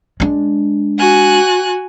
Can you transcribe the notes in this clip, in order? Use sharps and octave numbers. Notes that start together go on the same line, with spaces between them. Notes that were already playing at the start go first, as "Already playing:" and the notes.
G#3 D4
F#4 G#5 F#6